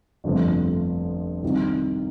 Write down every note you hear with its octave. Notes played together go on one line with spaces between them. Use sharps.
G1 F2 C3 F3 A3
C2 C3 D#3